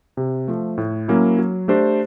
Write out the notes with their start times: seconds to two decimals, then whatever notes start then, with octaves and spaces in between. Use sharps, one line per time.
0.17 C3
0.48 F3 A3
0.78 A2
1.08 F#3 A#3 C#4 E4
1.38 F#3
1.68 A3 D4 G4 C5